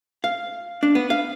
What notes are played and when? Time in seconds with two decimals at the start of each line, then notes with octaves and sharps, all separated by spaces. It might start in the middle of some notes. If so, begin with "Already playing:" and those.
0.24 F5
0.83 D4
0.95 B3
1.10 F5